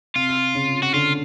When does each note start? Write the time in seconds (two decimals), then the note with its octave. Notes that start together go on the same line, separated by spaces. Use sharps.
0.15 C3 F4
0.55 C#3
0.83 F#4
0.94 D3 F4